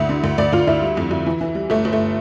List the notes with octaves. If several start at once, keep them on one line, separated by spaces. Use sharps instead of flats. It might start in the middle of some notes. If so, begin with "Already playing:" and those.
Already playing: D2 E4
D3
D2
D2 D5
D2 F4
D2 E4
G3
F2
F2
E3
E3
G3
G1 A3
G1
A3